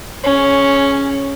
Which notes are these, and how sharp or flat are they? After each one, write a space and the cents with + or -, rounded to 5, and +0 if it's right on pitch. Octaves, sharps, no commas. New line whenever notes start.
C#4 +0 G#4 +15